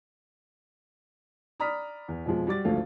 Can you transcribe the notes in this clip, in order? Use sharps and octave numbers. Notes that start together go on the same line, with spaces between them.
D5 A#5 B5 D#6 F6 B6
E2
F2 B2 F3 G#3
G3 F#4 D6 A6
G#1 D2 F3 A3 F5